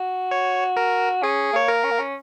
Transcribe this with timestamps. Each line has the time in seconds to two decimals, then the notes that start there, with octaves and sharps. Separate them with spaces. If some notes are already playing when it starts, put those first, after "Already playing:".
Already playing: F#4
0.31 C#5
0.77 A#4
1.23 C#4 G#4
1.53 A#3 C#5
1.68 A#4
1.84 C#4
1.91 A#3
1.99 C#4